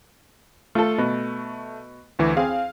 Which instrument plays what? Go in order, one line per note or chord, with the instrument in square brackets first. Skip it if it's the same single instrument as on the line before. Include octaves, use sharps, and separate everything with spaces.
[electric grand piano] A3 [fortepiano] F4 A4
[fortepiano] B2
[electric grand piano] D2 E3 E4
[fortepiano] C4 G#4 [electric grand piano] F5